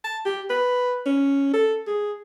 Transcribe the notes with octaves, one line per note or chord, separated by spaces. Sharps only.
A5
G4
B4
C#4
A4
G#4